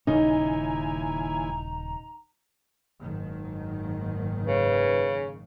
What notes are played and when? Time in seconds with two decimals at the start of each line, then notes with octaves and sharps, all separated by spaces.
0.07 D#1 D#2 C#3 C#4 D#4 E4 G#5 A#5
3.01 F#1 G#2 D#3
4.46 C#3 B4